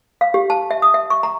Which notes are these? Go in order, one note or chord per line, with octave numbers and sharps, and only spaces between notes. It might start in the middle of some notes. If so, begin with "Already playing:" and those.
F5
G4
A5
E5
D#6
E5
C#6
A#5